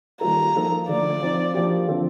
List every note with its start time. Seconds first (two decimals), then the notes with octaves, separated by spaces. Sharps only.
0.21 D#3 G3 A#3 F4 A4 A#5
0.55 F3 A#3 D#4 A4
0.88 D3 F3 A3 D4 D5
1.21 F3 C4 D#4
1.54 F3 A#3 D4 G4 A#4
1.88 D3 F3 C4 F4 A4